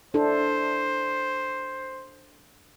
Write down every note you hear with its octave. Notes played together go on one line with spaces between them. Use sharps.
D4 E4 A4 C5